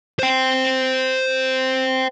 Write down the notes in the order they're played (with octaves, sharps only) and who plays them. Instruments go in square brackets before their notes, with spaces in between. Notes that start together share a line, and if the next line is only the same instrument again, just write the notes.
[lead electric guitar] C5 G5